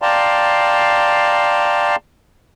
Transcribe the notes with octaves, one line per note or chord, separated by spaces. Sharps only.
D5 F5 G5 A5 A#5 C6